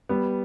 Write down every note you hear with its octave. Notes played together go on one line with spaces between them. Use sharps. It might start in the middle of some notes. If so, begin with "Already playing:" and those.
G3 B3